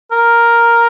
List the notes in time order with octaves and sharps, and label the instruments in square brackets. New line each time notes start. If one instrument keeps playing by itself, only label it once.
[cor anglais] A#4